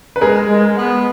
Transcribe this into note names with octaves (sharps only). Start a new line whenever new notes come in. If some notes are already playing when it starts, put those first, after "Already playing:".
B4
G#3 G#4 A#4
G#3
B3